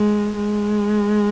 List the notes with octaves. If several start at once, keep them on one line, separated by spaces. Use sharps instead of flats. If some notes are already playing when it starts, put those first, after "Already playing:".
Already playing: G#3
G#3